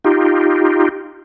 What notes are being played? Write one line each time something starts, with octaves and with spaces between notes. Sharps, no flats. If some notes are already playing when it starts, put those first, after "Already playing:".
D#4 F4 G4